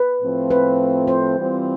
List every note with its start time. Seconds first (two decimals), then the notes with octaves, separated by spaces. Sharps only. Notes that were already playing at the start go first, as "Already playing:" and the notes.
Already playing: B4
0.21 A2 F3 A3 C4 F4
0.50 B4
1.07 C5
1.37 E3 G3 C4 F4